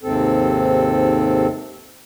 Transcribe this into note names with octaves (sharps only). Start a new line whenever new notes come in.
D#2 G#2 C3 C4 A4